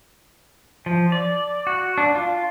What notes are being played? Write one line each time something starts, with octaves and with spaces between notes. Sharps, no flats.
F3
D5
F#4
D4
F4